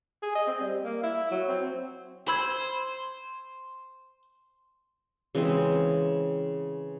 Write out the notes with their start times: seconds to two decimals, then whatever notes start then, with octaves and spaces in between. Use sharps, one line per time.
0.23 G#4
0.35 D#5
0.47 C4
0.61 G3
0.84 A#3
1.03 E4
1.31 F#3
1.49 C4
2.28 C5 B5 E6 G#6
5.35 C#3 E3 G#3 C4